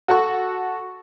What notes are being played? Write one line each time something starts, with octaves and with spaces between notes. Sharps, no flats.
F#4 A4 F#5 C#6